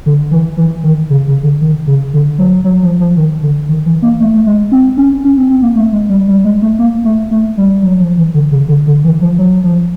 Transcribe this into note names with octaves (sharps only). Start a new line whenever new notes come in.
D3
E3
E3
D#3
C#3
C#3
D3
D#3
C#3
D3
F#3
F#3
F3
F3
D#3
D3
D#3
E3
A#3
A3
A3
G#3
C4
C#4
C#4
C4
C4
A#3
A3
G#3
G3
G3
G#3
A3
A#3
A3
A3
G3
F#3
F3
E3
D3
C#3
D3
D3
E3
F3
F#3
F3